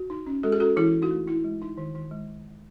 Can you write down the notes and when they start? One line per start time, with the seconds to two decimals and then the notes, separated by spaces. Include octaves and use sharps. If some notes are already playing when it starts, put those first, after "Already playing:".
Already playing: F#4
0.10 D#4
0.26 C#4
0.43 G#3 F#4 A4
0.52 G#4
0.60 C#4 F#4 A4
0.76 E3 E4 G#4
0.93 E3
1.02 D#4 F#4
1.11 A3
1.27 D#4 E4
1.44 G#3
1.62 D#4
1.78 D#3
1.95 D#3
2.11 G#3